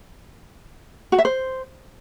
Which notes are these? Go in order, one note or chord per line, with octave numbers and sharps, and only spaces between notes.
F#4
E5
C5